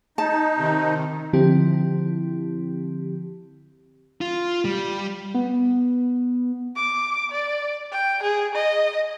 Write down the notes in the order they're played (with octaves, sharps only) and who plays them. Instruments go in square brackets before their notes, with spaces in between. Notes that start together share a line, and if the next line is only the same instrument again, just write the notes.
[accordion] D#4 [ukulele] A5
[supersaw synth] C3 D#3
[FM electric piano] D3 F3 C4 E4 G4
[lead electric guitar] F4
G3
[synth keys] B3
[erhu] D6
D5
G5
G#4
D#5